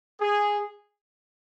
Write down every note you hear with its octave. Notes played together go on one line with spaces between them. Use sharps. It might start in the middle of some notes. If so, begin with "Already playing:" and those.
G#4